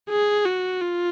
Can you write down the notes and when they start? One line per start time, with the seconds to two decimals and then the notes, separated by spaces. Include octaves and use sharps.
0.10 G#4
0.45 F#4
0.81 F4